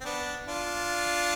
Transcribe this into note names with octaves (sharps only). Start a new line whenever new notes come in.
C4
B3 D4
D4 F4